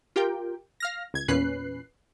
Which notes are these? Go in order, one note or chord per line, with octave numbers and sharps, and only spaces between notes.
F4 G4 A#4 G5
F5 F6 A#6
C#2 G#6
E2 A#2 C#4 B4 F#6 C7